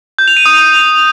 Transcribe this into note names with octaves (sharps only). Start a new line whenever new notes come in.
G6
F7
D#7
D#6